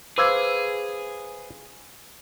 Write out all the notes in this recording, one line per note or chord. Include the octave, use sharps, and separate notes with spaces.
G#4 B4 C5 F5 D6 E6 G#6